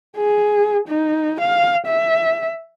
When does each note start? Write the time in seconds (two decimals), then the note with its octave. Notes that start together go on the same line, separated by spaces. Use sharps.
0.17 G#4
0.88 D#4
1.40 F5
1.86 E5